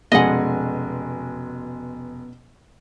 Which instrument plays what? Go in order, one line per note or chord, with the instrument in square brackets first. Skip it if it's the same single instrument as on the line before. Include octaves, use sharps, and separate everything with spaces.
[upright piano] F1 G#3 G#5 [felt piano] B2 C#4 [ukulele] D#5 F#5